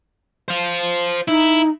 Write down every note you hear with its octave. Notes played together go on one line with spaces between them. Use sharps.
C5 F5
D#4 E4